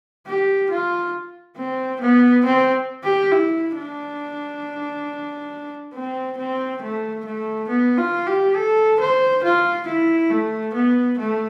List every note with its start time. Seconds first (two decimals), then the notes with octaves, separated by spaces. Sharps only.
0.27 G4
0.71 F4
1.58 C4
2.01 B3
2.45 C4
3.04 G4
3.32 E4
3.77 D4
5.94 C4
6.39 C4
6.82 A3
7.26 A3
7.69 B3
7.98 F4
8.27 G4
8.56 A4
9.01 C5
9.44 F4
9.88 E4
10.31 A3
10.74 B3
11.19 A3